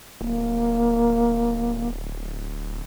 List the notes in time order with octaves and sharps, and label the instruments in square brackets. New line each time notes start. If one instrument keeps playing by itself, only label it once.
[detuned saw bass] D1 [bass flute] A#3